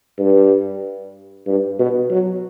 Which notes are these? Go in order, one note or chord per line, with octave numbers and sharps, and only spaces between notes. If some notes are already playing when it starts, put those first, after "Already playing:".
G2
G2
B2
F#3